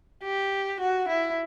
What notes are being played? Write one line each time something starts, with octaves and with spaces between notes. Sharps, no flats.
G4
F#4
E4